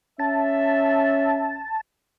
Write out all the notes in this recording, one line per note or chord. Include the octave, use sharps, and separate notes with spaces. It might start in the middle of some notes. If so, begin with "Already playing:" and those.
C#4 E5 A5